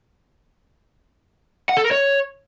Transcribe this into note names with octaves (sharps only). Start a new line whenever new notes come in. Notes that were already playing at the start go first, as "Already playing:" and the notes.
F#5
A4
A#4
C#5